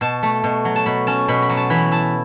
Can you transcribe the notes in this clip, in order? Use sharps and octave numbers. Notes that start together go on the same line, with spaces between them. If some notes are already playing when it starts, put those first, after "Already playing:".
B2 A5
A3
B2
F#3
A5
B2 B5
C#4 A5
B2 B5
B5
F#3
A5
E3 B5
E4 A5